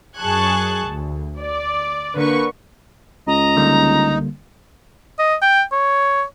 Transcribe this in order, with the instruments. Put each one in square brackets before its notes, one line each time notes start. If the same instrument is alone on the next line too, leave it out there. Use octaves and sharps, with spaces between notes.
[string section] F#2 G#4 A5 C#6 F#6 G#6
D2
D5
D3 A#3 B4 C#6
[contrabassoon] C#2 [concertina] D#5 [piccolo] A#5
[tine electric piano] D3 G3 A#3 [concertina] D#4
[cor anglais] D#5
G5
C#5